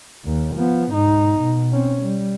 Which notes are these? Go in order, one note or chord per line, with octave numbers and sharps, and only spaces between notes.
D#2
F3 B3
G#2 D#4
B2
C4 C#4
G3